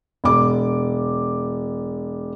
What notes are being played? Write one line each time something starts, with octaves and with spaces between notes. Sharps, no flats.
E1 D6